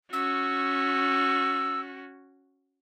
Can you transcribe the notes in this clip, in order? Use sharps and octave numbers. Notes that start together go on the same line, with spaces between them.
C#4 F#4 E6